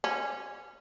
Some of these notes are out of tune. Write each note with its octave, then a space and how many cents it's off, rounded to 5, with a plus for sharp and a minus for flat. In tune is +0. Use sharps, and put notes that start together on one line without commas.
C#4 -10